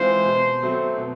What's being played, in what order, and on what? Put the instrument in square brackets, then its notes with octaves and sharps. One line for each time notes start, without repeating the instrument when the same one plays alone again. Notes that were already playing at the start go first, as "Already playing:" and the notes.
Already playing: [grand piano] E3 G#3 C4 F4 [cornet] C5
[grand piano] B2
F#3 A3 C4
B2